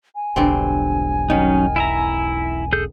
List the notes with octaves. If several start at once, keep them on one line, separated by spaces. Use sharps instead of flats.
G#5
E1 B1 G2 D3 C4
D#3 F#3 C#4 D#4
E4 E5 A#5
G#4 A4 G6